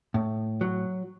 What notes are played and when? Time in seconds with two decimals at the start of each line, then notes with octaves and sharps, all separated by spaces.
0.14 A2
0.61 F#3